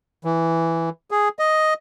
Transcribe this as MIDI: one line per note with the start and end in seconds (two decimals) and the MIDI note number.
0.25 0.89 52
1.11 1.29 68
1.39 1.74 75